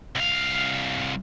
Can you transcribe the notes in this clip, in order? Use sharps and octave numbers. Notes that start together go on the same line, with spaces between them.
C2 F5